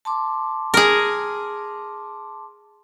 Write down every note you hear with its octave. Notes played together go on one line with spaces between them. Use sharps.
A5 C6 D6
G#4 A#4